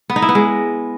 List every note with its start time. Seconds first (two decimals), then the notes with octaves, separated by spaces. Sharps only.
0.10 B3
0.16 D#4
0.22 E4
0.29 B3
0.35 G#3